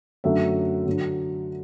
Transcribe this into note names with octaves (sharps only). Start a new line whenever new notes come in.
F#2 D3 F#3 A3 E5
D3 F#3